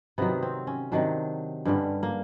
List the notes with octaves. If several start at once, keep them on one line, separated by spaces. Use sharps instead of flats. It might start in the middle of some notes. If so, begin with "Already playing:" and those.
C3 D#3 F#3 B3
C4
C#4
C3 D#3 F#3 D4
G2 D3 G3 C#4
A#3